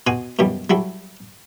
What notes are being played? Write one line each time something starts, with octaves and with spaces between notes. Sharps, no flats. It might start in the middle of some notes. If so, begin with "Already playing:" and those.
B2 F#4 G#5 C6 D#6
F#2 B2 E3 G3
F#3 G3 E4 A4